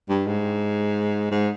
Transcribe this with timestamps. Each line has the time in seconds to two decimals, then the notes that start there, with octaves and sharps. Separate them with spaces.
0.09 G2
0.27 G#2
1.31 G#2